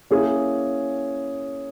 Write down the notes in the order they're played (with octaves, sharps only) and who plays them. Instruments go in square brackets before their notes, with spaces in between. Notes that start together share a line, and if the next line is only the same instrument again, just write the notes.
[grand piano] A#3 C#4 E4 G#4